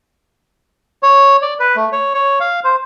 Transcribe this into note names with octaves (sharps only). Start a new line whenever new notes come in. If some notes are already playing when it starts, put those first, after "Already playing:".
C#5
D5
B4
A3
C#5
C#5
F5
C5